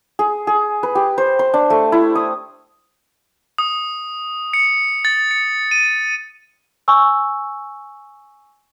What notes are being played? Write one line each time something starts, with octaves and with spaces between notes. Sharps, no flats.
G#4
G#4
B4
G4
C5
C6
D4
A3
E4
D#6
D#6
C#7
A6
C#7
D#7
G#5 C#6 E6